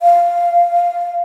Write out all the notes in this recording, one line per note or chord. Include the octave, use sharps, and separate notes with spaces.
F5